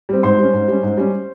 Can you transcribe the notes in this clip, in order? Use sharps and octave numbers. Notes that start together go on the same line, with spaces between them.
G3 C4
G#2 C5 C6
G3 C#4
G#2
G3 C#4
G#2
G3 C#4